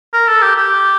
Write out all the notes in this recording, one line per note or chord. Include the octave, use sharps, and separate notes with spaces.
A#4
A4
G4
G4